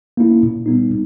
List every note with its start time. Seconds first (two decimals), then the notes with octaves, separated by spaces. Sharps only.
0.17 A#3 C#4 E4
0.43 A#2
0.66 G3 B3 D#4
0.90 A#2